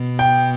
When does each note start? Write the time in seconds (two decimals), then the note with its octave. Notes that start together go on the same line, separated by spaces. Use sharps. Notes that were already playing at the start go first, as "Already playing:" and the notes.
Already playing: B2
0.19 G5